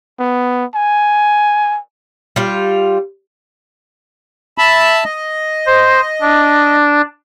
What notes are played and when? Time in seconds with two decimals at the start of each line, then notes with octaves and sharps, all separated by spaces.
0.19 B3
0.75 G#5
2.36 G3 F4
4.58 E5 A5 B5
5.04 D#5
5.66 C5
6.21 D4